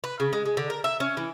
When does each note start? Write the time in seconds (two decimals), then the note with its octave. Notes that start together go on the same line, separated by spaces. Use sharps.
0.04 B4
0.20 C#3
0.33 G#3
0.46 G#3
0.57 D3
0.70 A#4
0.84 E5
1.00 C#4
1.17 E3